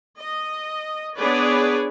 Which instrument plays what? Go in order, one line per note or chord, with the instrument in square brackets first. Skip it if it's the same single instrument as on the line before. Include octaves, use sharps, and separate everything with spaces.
[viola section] D#5
B3 D4 G#4 B4 C#5 D5